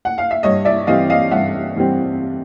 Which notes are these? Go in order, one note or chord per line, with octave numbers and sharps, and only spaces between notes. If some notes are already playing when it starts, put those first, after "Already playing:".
F#5
F5
E5
G2 C#5 D#5
D5 E5
E3 G3 C4 D#5 F5
D#5 F5
G2 E5 F#5
E3 G3 C4